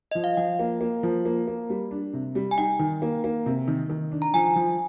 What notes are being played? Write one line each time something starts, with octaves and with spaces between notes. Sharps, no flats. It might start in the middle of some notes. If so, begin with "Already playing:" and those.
F3 D#5
F5
F3 G5
A#3
A#3
F3
A#3
A#3
G3
D4
C3
G3
G#5
D#4 G5
D#3
A#3
A#3
C3
D#3
D#3
D4
A#5
F3 G#5
F3